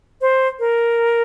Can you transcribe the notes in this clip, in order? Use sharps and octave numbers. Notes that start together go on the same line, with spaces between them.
C5
A#4